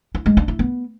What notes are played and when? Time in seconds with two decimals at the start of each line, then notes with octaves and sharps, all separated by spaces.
0.15 E4
0.26 G#3
0.37 D4
0.48 E4
0.59 B3